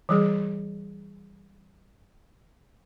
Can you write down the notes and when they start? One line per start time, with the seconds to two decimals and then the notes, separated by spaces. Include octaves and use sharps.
0.09 E3 G3 G#4